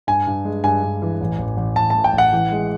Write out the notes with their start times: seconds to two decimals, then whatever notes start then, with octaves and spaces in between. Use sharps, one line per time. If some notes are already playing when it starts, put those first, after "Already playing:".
0.07 G2 G#5
0.27 G2
0.45 G#3
0.64 G2 G#5
0.83 G2
1.02 E3
1.21 A1
1.39 A1
1.57 A1
1.76 A1 A5
1.90 A2 A5
2.04 G5
2.13 A1
2.18 F#5
2.33 E3
2.51 G#3